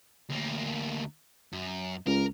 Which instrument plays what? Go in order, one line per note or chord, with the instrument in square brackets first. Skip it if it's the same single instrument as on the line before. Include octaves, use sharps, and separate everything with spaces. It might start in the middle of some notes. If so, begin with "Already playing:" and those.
[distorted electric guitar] D2 A#3
F#2
[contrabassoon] C#2 [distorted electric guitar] A#4